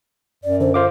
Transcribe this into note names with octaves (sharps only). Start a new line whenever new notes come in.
F#2 D5
D3 C5
F4 C5 F5 D6